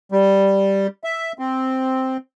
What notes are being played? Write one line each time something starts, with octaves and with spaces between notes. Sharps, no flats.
G3
E5
C4